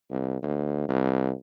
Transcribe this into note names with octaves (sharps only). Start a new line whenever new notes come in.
C2
D2
C2